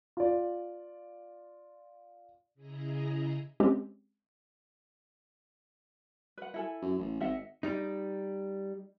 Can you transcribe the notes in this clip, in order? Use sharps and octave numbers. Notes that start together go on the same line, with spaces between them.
F4 D5
C#3 E4 G#4 D#5 A#5
G#3 C4 C#4 G4
B4 F#5
E4 A4 G#5
F#2
A1
G#1 D#5 E5 F#5
G3 D#4